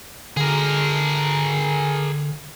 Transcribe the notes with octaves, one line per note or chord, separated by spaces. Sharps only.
D3 G#4 A#4